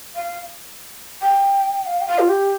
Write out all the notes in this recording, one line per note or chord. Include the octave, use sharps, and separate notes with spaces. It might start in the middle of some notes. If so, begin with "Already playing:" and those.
F5
G5
F5
G5
F5
F4
G4